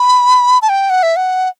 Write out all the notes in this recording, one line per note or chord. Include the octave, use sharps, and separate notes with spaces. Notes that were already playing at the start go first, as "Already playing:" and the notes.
Already playing: B5
A5
G5
F#5
E5
F#5